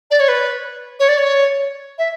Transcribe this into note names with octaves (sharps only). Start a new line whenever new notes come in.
D5
C#5
B4
C#5
D5
C#5
E5